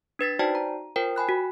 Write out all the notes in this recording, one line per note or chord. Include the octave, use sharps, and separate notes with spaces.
D4 B4 A6 B6
D#4 F#4 C5 D5 G5 A5
A#5
F4 A#4 C5 G5
G5 G#5 B5 F#6
F#4